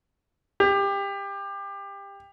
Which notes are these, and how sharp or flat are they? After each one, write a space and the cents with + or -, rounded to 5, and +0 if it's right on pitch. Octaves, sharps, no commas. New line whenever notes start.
G4 +20